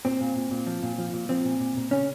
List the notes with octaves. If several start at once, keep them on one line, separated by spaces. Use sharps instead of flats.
A#2 C4
A#2
A#2
A#2
F3
A#2
F3
A#2
F3 C4
A#2
A#2
A#2
C#3 C#4